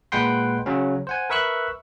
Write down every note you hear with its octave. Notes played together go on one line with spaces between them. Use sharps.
A#2 G#3 B4 F#5 G5 C6
C#3 F#3 C#4
C5 F#5 G#5
A#4 B4 E5 C#6 E6 F#6